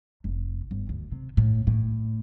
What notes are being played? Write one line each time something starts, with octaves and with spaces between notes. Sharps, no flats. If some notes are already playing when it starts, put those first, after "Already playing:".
F1
G1
D2
C3
A2
A2